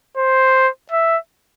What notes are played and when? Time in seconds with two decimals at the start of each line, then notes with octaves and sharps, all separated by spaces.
0.17 C5
0.91 E5